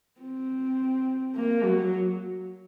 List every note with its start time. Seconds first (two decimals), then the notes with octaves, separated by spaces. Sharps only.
0.20 C4
1.35 A#3
1.65 F#3